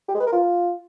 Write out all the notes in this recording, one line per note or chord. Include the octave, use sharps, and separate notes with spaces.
G4
G#3
B4
A#4
F4